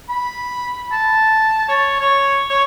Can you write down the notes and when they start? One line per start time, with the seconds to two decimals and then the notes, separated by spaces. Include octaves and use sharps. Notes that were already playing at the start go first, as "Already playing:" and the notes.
0.09 B5
0.92 A5
1.68 C#5
2.00 C#5
2.50 C#5